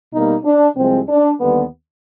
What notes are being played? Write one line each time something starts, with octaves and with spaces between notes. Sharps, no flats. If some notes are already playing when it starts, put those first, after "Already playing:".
B2 G3 A#3 D#4
D4
C2 C3 F3 G#3 C4
D4
D#2 D3 G3 B3